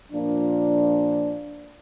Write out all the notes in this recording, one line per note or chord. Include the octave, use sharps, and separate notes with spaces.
A#2 F3 A#3 D4